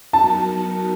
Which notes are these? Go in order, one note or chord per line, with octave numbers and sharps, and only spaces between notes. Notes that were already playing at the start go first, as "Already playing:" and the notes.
F#3 B3 D#4 F#4 A#4 A5